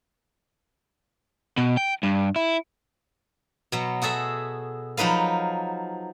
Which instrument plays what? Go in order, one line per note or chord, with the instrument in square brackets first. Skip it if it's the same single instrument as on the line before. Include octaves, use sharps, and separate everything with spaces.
[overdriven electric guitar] B2
G5
G2
E4
[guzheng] B2 F#3
F#4 G#4 A4 E5
F3 F#3 D#4 B4 F5